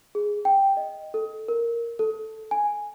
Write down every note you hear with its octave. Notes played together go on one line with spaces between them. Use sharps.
G#4
G5
D#5
A4
A#4
A4
G#5